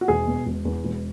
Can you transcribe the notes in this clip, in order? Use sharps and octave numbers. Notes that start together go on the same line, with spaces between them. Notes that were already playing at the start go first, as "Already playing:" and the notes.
F#4
E1 G#4
B2
E1
E2
E1